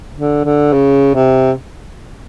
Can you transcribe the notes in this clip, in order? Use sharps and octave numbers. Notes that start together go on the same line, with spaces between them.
D3
D3
C#3
C3